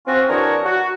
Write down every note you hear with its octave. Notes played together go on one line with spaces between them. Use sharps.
C4 C#4 F4 F#4
E3 D4 F#4 G#4 A#4 C#5
F#4